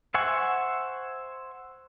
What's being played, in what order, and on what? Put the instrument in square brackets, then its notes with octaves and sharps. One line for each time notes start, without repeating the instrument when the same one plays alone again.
[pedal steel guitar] C5 E5 F#5 G#5 C#6